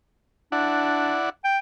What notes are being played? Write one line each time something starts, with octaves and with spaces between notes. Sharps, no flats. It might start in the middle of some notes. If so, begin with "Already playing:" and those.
D4 E4 D5 F#5
G5